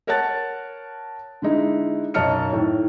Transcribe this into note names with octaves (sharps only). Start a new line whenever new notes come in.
A#4 C#5 F#5 A5 F#6 A6
D3 G#3 D#4 E4
B1 F#2 D#5 A5 F6 C#7
A2 D#3